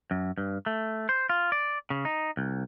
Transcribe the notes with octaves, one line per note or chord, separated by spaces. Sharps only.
F#2
G2
A3
C5
F4
D5
C#3
D#4
C2